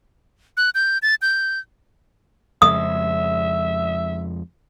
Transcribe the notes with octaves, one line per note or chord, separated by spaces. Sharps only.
F#6
G6
A6
G6
F2 C#3 G#3 E5 D#6